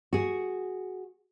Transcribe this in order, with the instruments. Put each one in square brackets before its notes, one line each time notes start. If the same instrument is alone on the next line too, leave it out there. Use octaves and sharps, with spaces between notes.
[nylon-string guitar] F#4 G#4